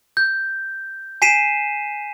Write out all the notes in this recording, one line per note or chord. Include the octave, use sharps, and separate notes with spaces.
G6
G#5 B6 C7 D#7 E7